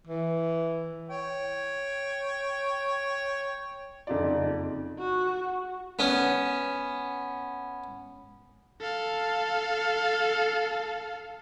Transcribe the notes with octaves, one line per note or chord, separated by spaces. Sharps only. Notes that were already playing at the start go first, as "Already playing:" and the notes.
E3
C#5 G5
F#1 F2 D#4 F4 D5
F#4
B3 C#4
A4 F5